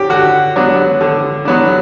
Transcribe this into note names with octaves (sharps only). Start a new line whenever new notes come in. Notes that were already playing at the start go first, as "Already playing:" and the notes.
Already playing: F#3 D4 G4
D3 F#4
F#3 B3 D4
D3
F#3 B3 D4